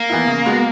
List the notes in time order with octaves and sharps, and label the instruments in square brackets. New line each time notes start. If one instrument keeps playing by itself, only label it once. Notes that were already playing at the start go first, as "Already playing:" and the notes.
Already playing: [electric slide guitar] A#3
[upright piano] E3 B3 E4
C#3
G#3 B3 F#4